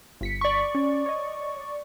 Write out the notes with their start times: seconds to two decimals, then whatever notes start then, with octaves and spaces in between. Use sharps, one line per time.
0.21 G1 B6 C#7
0.41 D5 C#6
0.75 C#4
1.06 C#5 D#5